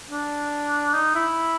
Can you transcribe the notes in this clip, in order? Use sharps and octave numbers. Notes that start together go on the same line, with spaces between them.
D4
D#4
E4